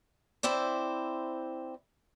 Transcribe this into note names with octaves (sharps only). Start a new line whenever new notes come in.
C4 E4 C5 D5